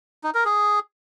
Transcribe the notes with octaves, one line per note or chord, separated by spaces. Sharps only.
D#4
A#4
G#4